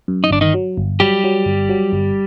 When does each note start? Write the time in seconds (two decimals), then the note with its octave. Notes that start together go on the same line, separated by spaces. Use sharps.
0.08 F#2
0.24 D#4
0.31 G1 D4
0.41 D#3 D#4
0.54 F#3
0.77 G1
1.00 F#3 G3 G4
1.24 F#3
1.46 G1
1.69 F#3
1.93 G1